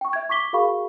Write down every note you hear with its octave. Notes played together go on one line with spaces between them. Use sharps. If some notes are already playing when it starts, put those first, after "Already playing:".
G5 C#6
E5 G#6
C#6 D6 B6 G7
F#4 G#4 A#4 F5 B5 C#6